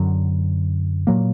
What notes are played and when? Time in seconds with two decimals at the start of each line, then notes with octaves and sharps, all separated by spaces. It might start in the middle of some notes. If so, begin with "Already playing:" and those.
Already playing: F#2 D3 F#3
1.07 A#2 F#3 A#3